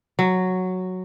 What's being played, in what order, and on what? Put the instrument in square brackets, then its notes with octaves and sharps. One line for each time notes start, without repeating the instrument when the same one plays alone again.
[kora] F#3